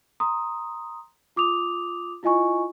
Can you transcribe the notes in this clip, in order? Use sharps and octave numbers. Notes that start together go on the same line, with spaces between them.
A#5 C6 D#6
F4 D6 D#6 F7
E4 F4 D#5 G#5 C#6